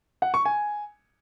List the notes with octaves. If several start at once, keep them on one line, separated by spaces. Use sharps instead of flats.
F#5
C#6
G#5